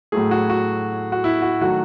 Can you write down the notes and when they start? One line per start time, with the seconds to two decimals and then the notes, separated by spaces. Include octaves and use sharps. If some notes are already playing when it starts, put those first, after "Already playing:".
0.12 A2 F#3 A3 G#4
0.31 F#4
0.50 F#4
1.12 F#4
1.24 E4
1.42 F#4
1.61 D#3 F#3 A3 F#4